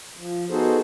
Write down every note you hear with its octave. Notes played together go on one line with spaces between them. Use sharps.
F3
B3 D#4 F#4 G#4 A4 C5